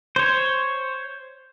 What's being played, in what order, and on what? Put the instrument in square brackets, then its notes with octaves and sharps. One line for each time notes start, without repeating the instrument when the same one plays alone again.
[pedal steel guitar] C5 C#5